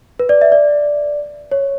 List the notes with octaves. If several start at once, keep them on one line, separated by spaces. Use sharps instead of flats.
B4
D5
E5
D5
C#5